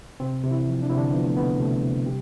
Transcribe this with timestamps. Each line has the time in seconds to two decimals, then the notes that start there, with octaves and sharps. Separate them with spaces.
0.20 C3 C4
0.43 C3
0.51 E3 E4
0.67 F3
0.82 D4
0.90 C3 E4
0.97 D3 D4
1.13 F3 B3
1.25 A3
1.36 D2 B2 B3
1.60 C3 A3
1.83 C3
2.06 G3 G4